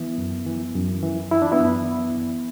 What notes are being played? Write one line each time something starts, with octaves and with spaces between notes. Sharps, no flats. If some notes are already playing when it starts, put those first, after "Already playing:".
Already playing: E3 B3 E4
F#2
E3
F#2
E3
E3 E4
D4
B3 E4
F#2
E3
E3